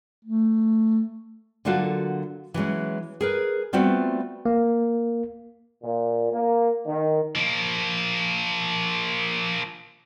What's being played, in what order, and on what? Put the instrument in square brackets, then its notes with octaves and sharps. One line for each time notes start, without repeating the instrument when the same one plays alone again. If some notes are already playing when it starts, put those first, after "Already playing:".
[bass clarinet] A3
[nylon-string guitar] D3 F#3 A#3 F4 F#4 A4
E3 F#3 G#3 C#4
G#4 A#4 B4
G3 A3 B3 C4 F4 F#4
[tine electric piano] A#3
[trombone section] A#2
A#3
D#3
[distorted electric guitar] F3 A#3